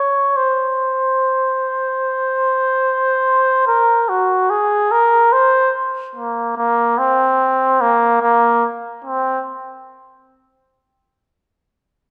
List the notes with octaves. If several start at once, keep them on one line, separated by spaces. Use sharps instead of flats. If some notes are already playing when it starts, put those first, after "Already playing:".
Already playing: C#5
C5
A#4
F#4
G#4
A#4
C5
A#3
A#3
C4
A#3
A#3
C4